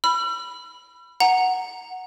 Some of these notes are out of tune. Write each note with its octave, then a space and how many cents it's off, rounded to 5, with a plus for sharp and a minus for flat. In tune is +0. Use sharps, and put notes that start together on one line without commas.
B5 +0 E6 +45
F#5 +0 A#5 +0